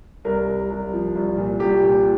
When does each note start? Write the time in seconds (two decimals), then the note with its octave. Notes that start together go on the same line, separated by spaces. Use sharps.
0.25 C2 A#4
0.47 C2
0.70 C2
0.93 F3
1.15 C2
1.37 A#2
1.60 C2 G4
1.82 A#2